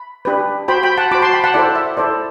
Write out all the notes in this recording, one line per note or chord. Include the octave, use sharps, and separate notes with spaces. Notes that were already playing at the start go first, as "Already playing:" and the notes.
Already playing: B5
D4 G4 B4
F#4 C5 G5 B5
G5 B5
F#5 A5
F#4 C5 B5 D6
A5 C6
G5 B5
F#5 A5
E4 A4 C5 D5
E5
E4 A4 C5 D5